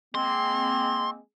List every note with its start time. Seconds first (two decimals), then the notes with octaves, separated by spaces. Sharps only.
0.15 G#3 A#3 C4 C6